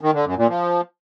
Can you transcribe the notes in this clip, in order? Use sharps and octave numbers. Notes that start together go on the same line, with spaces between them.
D#3
D3
F#2
A#2
F3